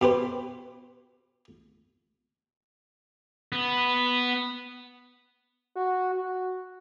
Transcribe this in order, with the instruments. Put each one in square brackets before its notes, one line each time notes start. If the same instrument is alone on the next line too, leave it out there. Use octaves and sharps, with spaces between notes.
[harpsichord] B2 G4 B4 C5
[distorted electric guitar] B3
[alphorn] F#4
F#4